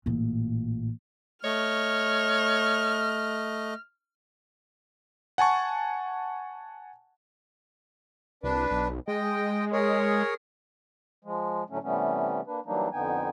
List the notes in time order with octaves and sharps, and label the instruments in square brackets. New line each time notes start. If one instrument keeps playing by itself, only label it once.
[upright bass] A1 A#2
[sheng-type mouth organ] A3 D#5 [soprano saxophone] C#5 [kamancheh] F6
[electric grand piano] F#5 G#5 A5 C#6
[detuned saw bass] C2 [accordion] D4 B4
[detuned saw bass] B1
[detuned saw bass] G#3 [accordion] D#5 G5
[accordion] G#4 A#4 C#5
[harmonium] F3 G#3
A2 D3 F#3 A3 C#4
C3 E3 G3 A3 B3 C#4
A#3 D4 B4
E3 F#3 G3 A#3 D4 D#4
F2 D3 B3 D#4 G5 G#5